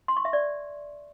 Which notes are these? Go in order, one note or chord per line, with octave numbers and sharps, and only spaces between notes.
C6
C#6
E5
D5